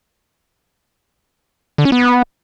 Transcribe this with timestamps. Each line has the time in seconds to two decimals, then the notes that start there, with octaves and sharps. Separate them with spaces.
1.78 D3
1.85 C#4
1.92 B3